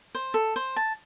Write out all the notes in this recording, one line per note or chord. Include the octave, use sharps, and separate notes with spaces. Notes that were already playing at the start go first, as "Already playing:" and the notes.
C5
A4
C5
A5